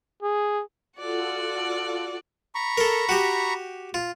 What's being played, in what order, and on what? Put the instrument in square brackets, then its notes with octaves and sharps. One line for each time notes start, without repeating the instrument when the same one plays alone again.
[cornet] G#4
[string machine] F4 A4 [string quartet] F#4 D5 F#5
[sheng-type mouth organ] A#5 B5 C#6
[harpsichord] A4 A#4
F#4 G4
F4